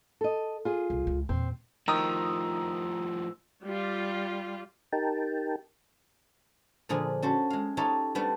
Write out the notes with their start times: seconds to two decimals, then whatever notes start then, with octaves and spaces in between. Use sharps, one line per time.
0.21 A4 D#5
0.65 F4 G#4
0.90 C2
1.07 C#2
1.29 E2 A#2 C4
1.88 A2 D#3 F3 A#5 D#6 E6
3.66 G3 F4
4.93 D#4 G4 A#4 G5 A5
6.89 A#2 D3 F3 G#4
7.22 C#4 F#4 A4 C5
7.50 G#3 F5
7.77 D#4 F4 G4 A4 C#5 E5
8.15 G3 A3 B3 D4